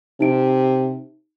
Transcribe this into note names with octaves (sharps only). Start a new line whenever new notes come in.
C3 D#4 D7